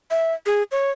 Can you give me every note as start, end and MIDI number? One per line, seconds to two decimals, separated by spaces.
0.11 0.34 76
0.46 0.63 68
0.72 0.91 73